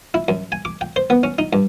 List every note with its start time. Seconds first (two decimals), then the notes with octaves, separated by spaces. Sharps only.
0.14 E4
0.28 F#2
0.52 G#5
0.65 D6
0.81 G5
0.96 C5
1.10 B3
1.23 C#4
1.38 D#4
1.53 G2